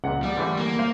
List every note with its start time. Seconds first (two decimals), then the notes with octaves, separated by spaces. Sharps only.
0.04 C#2 A#2 F#5
0.23 G3
0.37 D3 E3 A3
0.57 A#3
0.79 C5 F5